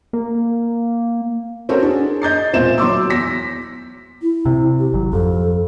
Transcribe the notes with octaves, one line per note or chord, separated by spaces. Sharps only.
A#3
C4 C#4 F#4 A4 A#4
D4 G#4
D#5 G6 A6 C7
E1 A#2 C4 E5 E7
F#3 C6 D6 E6
E2 A#6 B6
E4
C3
G4
G#1 F#3
F2 A4